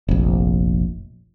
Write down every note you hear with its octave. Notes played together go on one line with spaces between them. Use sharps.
F1 A#1